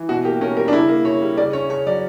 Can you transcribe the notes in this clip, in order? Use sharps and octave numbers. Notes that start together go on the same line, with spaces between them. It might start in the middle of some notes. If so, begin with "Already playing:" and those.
Already playing: E3
B2 F#4
A#3 G4
C#4 A#4
G3 A#4
D4
C#3 E4
A#3
C#3 C#5
G3
C#3 D5
C#4 C#5
C#3 C#5
F#3 D5